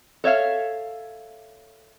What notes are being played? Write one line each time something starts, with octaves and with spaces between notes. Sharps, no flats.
A4 C#5 E5 F5